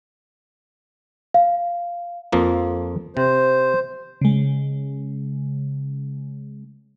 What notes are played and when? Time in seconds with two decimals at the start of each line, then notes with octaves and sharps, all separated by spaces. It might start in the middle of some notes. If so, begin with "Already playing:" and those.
1.34 F5
2.32 F2 F3 A#3
3.17 C3 C5
4.21 C#3 G#3